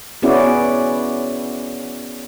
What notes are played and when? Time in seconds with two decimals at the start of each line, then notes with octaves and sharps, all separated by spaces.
0.22 B3 C#4 E4 F#4 G#4 D5